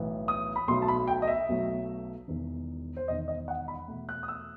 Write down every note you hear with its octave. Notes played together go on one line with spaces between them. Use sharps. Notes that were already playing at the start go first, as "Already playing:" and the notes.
Already playing: B1 A2 E3 B3
D#6
B5
B1 B2 F#3 A3 C6
A5
B5
G5
D#5
E5
B1 B2 F#3 A3
E1 E2 D#3
C5
E1 E2 D#3 D#5
D#5
F#5
B5
E2 B2 A3
F#6
D#6
E6